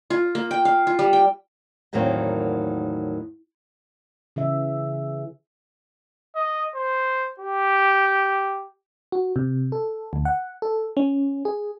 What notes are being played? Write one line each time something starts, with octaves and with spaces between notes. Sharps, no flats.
F4
A#3
G5
F5
F4
G3
G5
E2 A2 D#3 F#3 A#3 C4
C#3 E3 E5
D#5
C5
G4
F#4
C3
A4
D2
F#5
A4
C#4
G#4